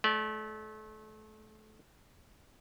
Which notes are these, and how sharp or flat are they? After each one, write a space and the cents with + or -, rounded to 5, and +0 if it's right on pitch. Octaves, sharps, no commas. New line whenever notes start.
A3 -30 D5 +0